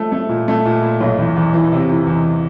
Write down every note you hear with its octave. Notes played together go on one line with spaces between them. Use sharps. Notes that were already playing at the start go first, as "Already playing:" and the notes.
Already playing: F3 A3
A3
A#2
A3
A#2
A#2
B1
E2
E2
E3
C3
E3
E2